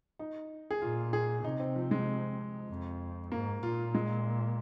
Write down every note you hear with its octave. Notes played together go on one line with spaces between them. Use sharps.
D#4
G#4
A#2 F4
G#4
C3 D#4
C4
F3
G#3
F2
G#2 A#3
A#2 F4
G#3